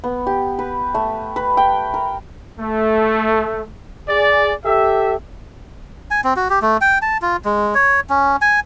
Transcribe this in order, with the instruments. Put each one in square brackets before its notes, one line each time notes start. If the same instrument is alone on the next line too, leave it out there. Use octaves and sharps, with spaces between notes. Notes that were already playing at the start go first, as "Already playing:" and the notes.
[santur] B3
G4
B4
A3
B4
G5
A#4
[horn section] A3
G#4 D5
G4 A4 E5
[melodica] G#5
C4
F#4
G4
A3
G5
A5
F4
G#3
C#5
C#4
G#5